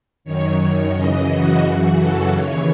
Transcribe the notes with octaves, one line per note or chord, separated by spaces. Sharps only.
F#2 D#3 C#5
C#5
F#2 C#3 E3 D#5
F#4
F#2 C#3 E3 F#4
A4
D#2 C#3 E3 C#5